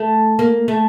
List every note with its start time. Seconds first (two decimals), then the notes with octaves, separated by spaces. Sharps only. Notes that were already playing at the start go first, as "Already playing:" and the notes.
Already playing: A3
0.39 A#3
0.68 A3